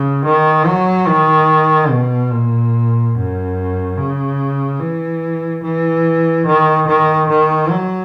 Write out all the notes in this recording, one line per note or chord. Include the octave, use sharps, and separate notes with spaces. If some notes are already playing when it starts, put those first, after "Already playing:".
Already playing: C#3
D#3
F#3
D#3
B2
A#2
F#2
C#3
E3
E3
D#3
D#3
D#3
F#3